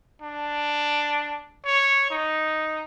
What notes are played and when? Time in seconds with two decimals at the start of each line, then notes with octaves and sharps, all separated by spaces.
0.22 D4
1.65 C#5
2.11 D#4